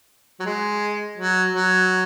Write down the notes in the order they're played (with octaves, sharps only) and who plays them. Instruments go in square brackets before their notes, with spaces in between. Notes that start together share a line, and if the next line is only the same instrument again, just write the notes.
[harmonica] F#3
G#3
F#3
F#3